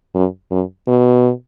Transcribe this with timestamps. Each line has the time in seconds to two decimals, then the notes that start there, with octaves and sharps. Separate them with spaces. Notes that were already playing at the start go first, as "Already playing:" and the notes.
0.15 F#2
0.51 F#2
0.88 B2